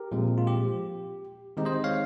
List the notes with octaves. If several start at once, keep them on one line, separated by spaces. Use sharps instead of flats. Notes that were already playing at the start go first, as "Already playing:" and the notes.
Already playing: G4 A#4
A#2 F3 G#3 C4
F4
G4
D#3 G#3 C4 D#4 G4
C5 D#5
C#5 F5